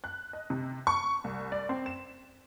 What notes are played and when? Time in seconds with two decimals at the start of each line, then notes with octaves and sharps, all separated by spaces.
0.04 F#6
0.33 D#5
0.50 C3
0.87 C#6
1.24 C2
1.52 D5
1.69 C4
1.86 E7